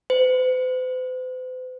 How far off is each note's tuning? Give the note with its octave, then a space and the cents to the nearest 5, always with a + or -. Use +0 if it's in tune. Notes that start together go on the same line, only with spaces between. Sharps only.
C5 -45